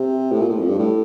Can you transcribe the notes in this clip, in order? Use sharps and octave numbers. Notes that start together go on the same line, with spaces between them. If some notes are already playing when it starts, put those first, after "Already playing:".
Already playing: C3
A2
A#2
A2
F2
G2
A2